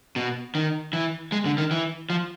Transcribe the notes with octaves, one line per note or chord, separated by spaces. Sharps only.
B2
D#3
E3
G#3
D3
D#3
E3
F3